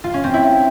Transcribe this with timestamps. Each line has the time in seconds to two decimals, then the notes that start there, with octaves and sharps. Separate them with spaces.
0.04 F4
0.14 C#4
0.24 C4
0.34 E4